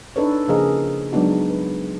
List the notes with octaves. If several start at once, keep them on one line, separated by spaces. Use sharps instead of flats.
D4 D#4 A4 B4 C#5
C#3 F3 A#3 G#4 A#4 D#5
F#3 G#3 B3 D4 D#4 F#4
B4